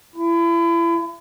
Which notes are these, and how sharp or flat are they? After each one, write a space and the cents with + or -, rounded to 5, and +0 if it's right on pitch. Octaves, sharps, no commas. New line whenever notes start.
E4 +35